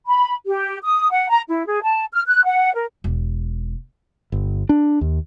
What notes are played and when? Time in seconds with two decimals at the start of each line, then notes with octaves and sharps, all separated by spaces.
0.06 B5
0.47 G4
0.83 D#6
1.11 F#5
1.29 A#5
1.48 E4
1.67 G#4
1.82 A5
2.13 F6
2.27 F#6
2.45 F#5
2.75 A#4
3.04 E1
4.32 G1
4.69 D4
5.01 D#2